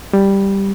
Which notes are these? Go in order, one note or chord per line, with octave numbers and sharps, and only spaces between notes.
G3